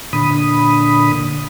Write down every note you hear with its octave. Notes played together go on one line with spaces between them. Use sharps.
A#2 D3 B5 D#6